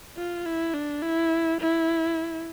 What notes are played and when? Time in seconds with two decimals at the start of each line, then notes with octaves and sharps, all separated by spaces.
0.17 F4
0.46 E4
0.74 D4
1.02 E4
1.61 E4